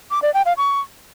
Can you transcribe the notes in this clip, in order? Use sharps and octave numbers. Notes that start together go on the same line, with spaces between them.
D6
D5
G5
F5
C#6